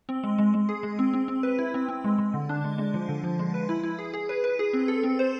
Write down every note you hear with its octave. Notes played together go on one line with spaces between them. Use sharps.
C4
G#3
G#3
G#3
G#4
G#3
C4
C4
C4
B4
E4
C4
C4
G#3
G#3
D3
D4
G#3
G#3
F3
D3
F3
G#3
B4
E4
E4
G#4
G#4
B4
B4
G#4
C4
A4
C4
C5